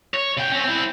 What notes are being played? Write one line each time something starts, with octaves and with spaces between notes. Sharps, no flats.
C#5
C#3 G5
C4 C#4
C4 E4